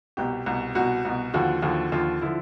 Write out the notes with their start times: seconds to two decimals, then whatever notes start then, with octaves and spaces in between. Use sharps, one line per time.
0.17 C2 B2 G4
0.46 C2 B2
0.75 C2 B2 F#4
1.05 C2 B2
1.34 D#2 D3 F3 F#4
1.63 D#2 D3 F3
1.92 D#2 D3 F3 F4
2.21 D3 F3 E4